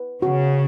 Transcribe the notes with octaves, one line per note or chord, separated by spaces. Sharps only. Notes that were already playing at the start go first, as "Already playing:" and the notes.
Already playing: B4
C#3 F#4